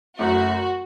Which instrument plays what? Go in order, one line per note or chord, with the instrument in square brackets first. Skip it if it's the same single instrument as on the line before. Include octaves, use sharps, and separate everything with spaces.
[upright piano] F#1 F#2 F#3 A3 [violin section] F#4